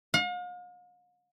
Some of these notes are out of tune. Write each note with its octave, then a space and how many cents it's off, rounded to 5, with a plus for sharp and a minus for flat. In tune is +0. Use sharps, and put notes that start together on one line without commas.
F5 +45